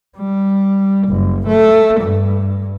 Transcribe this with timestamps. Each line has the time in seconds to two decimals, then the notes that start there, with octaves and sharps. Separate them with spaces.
0.17 G3
1.08 F#1
1.48 A3
2.00 G2